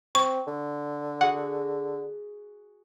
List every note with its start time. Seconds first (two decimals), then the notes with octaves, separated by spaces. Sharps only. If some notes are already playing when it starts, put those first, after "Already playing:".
0.15 C4 C#6
0.47 D3
1.21 F#4 G#4 F#5